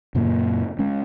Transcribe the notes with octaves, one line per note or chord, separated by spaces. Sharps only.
F#2 A#2 C#3 A#3
G#3 C#4